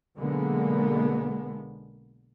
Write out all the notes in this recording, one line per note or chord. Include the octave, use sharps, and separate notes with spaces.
B1 D3 G#3 A#3 B3